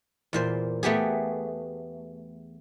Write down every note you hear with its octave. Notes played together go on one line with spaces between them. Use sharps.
E2 A#2 C5
A3 B3 G4 G#4